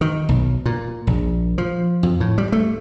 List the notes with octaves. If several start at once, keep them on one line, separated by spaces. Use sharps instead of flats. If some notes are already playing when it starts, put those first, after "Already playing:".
D#3
B1
A#2
A#1
F3
F2
A2
G3
A3